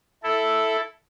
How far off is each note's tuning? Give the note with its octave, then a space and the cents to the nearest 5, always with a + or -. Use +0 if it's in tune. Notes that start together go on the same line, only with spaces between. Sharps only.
E4 +0 A4 +0